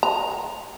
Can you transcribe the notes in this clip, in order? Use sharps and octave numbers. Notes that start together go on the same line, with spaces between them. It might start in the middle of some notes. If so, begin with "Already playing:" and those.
A#5